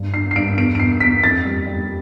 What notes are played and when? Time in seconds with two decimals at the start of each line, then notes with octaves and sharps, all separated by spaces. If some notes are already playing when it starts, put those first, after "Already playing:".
Already playing: G2
0.13 D4 C7
0.31 C7
0.36 G2 D7
0.58 E2 D7
0.75 D7
0.79 B2 C7
1.00 E2 B6
1.23 F2 A6
1.45 G3
1.67 G3